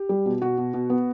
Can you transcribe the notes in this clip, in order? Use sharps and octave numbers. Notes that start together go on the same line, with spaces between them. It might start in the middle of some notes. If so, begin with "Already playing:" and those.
Already playing: G4
G3
B2
B2 F#4
B2
B2
B3